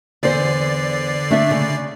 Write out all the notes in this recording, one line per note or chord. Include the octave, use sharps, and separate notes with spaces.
E2 D3 C5 D5 C7
A3 D4 E5
C#3